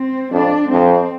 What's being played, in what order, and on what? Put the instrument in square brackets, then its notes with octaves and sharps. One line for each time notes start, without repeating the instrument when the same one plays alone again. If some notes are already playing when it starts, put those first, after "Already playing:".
Already playing: [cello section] C4
[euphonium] F2 [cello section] D4
[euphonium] F2 [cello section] C4